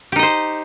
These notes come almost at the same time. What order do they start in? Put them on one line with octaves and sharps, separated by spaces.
G4 D#4 D#5 C5